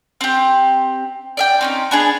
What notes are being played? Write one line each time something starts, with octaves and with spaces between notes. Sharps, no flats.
C4 G4
D5 E5 G5
C4 C#4 D#4
B3 D4 G#4